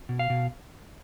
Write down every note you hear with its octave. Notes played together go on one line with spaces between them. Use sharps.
B2
F5
B2